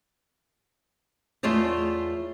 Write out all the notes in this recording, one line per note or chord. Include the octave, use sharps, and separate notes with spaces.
E2 A3 F4 G#4 C#5 D5